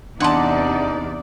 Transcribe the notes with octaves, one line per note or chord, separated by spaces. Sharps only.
E2 C3 D4 D#4 D5 F#5 A5 C6